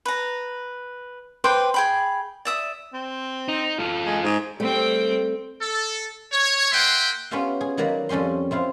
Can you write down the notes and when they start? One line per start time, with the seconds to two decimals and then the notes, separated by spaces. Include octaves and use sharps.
0.05 B4 A#5
1.44 B4 C5 G5 D6
1.74 G#4 G5 B5
2.45 D5 E5 D#6
2.93 C4
3.49 D#4
3.79 F4 A4
4.05 G#3
4.24 G#2
4.60 G3 A3 C4 G5
5.62 A4
6.32 C#5
6.72 A#3 E5 F#5 G5 C6
7.31 B3 C#4 F4 G4 E5 F5
7.61 G#4
7.77 D#3 F#3 A#3 D5 A#5 B5
8.09 F2 G3 C#4 G4 C6
8.51 C4 E4 F4 F5